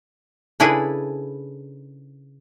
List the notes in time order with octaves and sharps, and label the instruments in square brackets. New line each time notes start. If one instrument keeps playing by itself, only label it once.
[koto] C#3 D4 E4 G#4 A4 B4